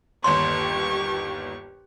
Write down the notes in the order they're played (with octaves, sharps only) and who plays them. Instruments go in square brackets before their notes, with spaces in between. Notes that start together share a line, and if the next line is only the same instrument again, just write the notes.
[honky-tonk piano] G1 D#2 C#5 [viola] G4 C#6 [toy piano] C6